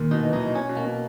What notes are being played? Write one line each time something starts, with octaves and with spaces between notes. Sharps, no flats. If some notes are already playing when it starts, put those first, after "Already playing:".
Already playing: D#2 A#2
B2 D#4
E3
F#3 D#4
C#4
B2
A#3
B2